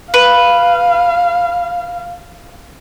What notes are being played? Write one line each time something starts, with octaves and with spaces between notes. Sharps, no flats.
B4 F5